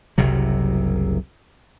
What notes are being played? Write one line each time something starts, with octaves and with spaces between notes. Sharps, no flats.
F#1 C2 C3 F#3